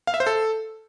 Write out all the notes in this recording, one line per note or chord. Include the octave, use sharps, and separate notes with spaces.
F5
E5
C5
A4